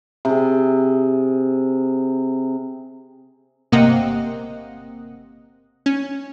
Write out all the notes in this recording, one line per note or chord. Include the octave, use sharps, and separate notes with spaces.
C3 G#4
G1 C3 A#3 C4 D#5 F#5
C#4